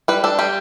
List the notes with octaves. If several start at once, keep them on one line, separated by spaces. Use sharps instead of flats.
G3 B4
D4 A4
G3 G4